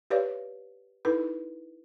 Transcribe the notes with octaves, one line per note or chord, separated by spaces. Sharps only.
G4 B4 C#5 D5 F5
D#4 E4 A4 B4